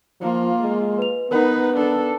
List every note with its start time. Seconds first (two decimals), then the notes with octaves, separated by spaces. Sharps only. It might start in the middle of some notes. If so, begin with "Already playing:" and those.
0.21 F3 A#3 F4
0.61 G#3
0.98 B4 F7
1.31 B3 D#4 A#4 B4 F#5
1.76 D4 A4